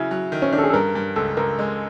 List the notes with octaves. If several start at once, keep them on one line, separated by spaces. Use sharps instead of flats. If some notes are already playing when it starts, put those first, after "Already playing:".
Already playing: C#3 F#3 E4
F#3
D#3
C#4
D#3 D4
A4
G#4
A4
G2 A#4
G2
C#2 A4
C#2 A#4
G#3